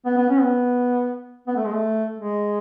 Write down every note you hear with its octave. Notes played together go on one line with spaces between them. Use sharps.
B3
B3
C#4
B3
B3
A3
G#3
A3
G#3